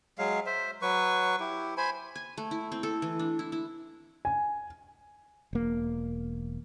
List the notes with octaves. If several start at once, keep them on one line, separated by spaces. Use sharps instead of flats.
F#3 G#3 F5
C5 E5
F#3 B4 C#6
E4 G4
C5 G#5 B5
G#5
A3
E4
C4
A4
E3
D4
E4
E4
G#5
E1 A#3